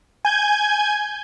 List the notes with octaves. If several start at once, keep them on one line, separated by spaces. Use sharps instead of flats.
G#5 G6 G#6